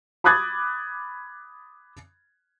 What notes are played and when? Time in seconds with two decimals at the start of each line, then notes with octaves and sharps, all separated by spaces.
0.24 B5 D6 D#6 F#6 G#6 A6